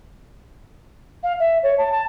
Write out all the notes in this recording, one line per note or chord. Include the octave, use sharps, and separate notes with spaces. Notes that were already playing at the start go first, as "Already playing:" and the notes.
F5
E5
C#5
A5
A5